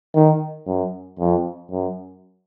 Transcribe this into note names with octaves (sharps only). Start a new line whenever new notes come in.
D#3
F#2
F2
F#2